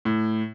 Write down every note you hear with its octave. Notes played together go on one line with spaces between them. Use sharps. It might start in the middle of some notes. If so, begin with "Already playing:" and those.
A2